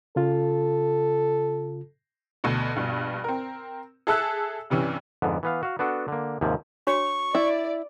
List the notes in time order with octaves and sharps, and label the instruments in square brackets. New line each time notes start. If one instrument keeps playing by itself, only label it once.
[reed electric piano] C#3 F4 [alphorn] A4
[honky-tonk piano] D2 B2
A#1 G2 B2
C4 A#4
G#4 A4 E5 A5 E6 F#6
G2 C3 E3 C#4
[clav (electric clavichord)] F2 G#2 D3 B3
E3 B3 F5
F#4 F5
B3 D4 F#4 A4
D3 A#3
D#2 G#2 C3 F3
[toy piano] D4 F#4 C#5 [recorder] C#6
[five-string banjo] E4 [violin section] D5